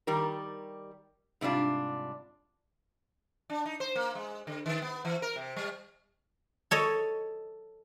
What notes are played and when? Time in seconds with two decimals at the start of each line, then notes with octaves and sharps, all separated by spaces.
0.07 D#3 G3 G4 A#4
1.41 G#2 C3 G3 D4 F4
3.50 D4
3.66 D#4
3.80 C5
3.96 A#3
4.15 G#3
4.47 D3
4.66 D#3
4.82 B3
5.05 E3
5.22 A#4
5.36 C3
5.56 G3
6.71 A4 C#5 D#5